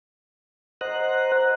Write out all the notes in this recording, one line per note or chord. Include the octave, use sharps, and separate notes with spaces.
C5 D#5 F#5 A#5 F#6